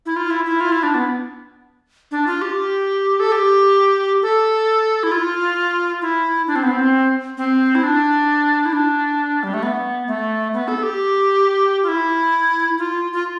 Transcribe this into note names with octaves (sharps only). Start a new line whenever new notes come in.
E4
F4
E4
E4
F4
E4
D4
B3
D4
F4
G4
A4
G4
A4
E4
F4
E4
D4
C4
B3
C4
C4
E4
D4
E4
D4
G3
A3
B3
A3
B3
A4
G4
F4
E4
F4
F4